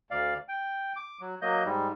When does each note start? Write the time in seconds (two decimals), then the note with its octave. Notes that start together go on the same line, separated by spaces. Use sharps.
0.11 D2 D5 F5
0.49 G5
0.96 D6
1.21 F#3
1.42 F#3 A#3 D#5 G6
1.65 G#2 G3